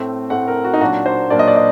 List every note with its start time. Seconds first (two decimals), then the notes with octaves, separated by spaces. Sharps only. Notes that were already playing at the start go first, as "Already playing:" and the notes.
Already playing: A2 A3 C4
0.30 A2 A3 C4 F#5
0.48 A#4
0.64 F#4
0.74 D#4
0.81 A#2 F#3 A#3 D4 F#4
1.06 C5
1.30 A#2 F#3 A#3 D4 D5
1.39 D#5
1.48 D5
1.56 D#5